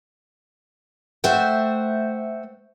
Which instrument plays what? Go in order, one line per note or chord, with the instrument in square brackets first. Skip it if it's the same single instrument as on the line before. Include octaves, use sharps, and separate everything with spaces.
[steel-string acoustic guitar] A3 C5 E5 F#5 G5